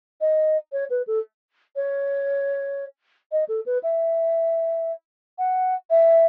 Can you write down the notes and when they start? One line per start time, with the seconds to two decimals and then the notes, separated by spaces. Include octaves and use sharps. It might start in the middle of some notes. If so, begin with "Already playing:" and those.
0.20 D#5
0.72 C#5
0.90 B4
1.07 A4
1.76 C#5
3.32 D#5
3.48 A4
3.66 B4
3.83 E5
5.38 F#5
5.90 E5